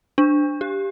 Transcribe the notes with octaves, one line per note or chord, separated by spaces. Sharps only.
D4
G4